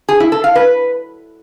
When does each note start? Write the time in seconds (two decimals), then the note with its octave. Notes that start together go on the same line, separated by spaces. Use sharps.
0.09 G#4
0.20 E4
0.32 A4
0.44 F5
0.55 B4